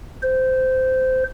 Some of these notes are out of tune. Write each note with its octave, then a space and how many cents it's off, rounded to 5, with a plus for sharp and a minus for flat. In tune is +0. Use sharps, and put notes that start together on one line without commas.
C5 -15